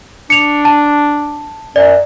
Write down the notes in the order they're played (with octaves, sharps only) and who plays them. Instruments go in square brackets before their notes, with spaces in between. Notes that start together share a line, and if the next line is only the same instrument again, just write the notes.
[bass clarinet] D4 [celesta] C#7 F7
[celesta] A5
[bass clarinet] F#2 [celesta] D5